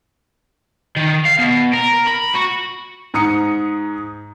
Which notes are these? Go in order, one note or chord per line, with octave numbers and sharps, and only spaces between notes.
D#3
F5
B2
A#4
B5
F#4
G#2 A#5 D#6 C#7